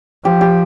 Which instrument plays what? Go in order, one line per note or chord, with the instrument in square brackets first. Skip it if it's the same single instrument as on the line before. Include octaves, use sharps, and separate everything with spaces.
[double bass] F3 [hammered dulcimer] G4
[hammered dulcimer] G4